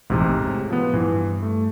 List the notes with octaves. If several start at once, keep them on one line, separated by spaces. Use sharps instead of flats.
E1 A1 G#2 C3
A2
F3 B3
G2 E3
A3